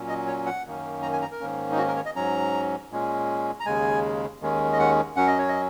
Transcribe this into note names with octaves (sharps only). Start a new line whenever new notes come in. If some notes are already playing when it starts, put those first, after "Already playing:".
Already playing: A#2 F#3 C#4
D#5
C#5
F#5
F#2 D#3 A#3 C#4
A#5
G#5
A#5
A#4
G#2 D#3 A#3 C#4
D#4
F#4
A#4
C#5
D#5
G#2 F#3 C#4 A#5
A#2 G#3 C#4
A#5
D#2 C#3 G#3 G#5
D#2 D#3 G#3 C#4
D#5
F#5
F#2 F#3 C#4 F#5
D#5
C#5
D#5